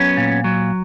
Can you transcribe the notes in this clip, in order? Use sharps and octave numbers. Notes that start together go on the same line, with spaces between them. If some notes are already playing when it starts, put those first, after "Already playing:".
Already playing: F#3 B3 C#4
A#2
F#3